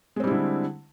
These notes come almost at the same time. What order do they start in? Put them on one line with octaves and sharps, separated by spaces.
G#3 C4 G3 E4 D3